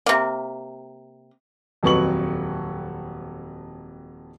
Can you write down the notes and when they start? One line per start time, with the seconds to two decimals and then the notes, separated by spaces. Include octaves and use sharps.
0.06 C3 A#3
1.83 D#1 F2 F#3 B4 C#6 F#7